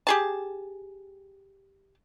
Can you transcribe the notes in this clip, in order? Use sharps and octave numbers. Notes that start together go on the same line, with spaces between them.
G4 G#4 A5